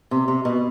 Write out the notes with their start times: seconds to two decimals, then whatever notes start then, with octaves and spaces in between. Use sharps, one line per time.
0.11 C3
0.28 C3
0.45 B2